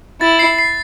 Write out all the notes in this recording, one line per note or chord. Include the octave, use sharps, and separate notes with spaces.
E4 A6
C7
C7